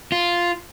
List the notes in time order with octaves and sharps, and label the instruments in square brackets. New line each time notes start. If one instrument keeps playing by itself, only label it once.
[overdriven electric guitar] F4